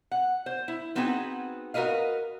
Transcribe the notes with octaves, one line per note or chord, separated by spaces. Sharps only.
F#5
C5
E4
B3 C4 D#4 F#4 G#4 B4
F#4 A#4 B4 D#5 F5